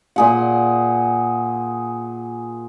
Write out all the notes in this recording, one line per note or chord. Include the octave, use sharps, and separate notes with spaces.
A#2 G#4 F#5